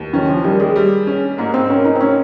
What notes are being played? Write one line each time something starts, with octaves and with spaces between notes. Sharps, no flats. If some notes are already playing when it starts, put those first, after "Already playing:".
Already playing: D#2
D#3 C#4
F3
D#3 G3
G#3
G3
C#4
G#2 A#3
C4
A#3 C#4
D#4
C4
C#4